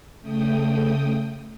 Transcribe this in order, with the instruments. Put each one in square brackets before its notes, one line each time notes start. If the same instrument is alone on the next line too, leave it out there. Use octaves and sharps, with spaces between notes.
[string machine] C#3 A3 G5 D#6